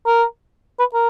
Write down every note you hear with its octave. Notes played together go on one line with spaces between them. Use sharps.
A#4
B4
A#4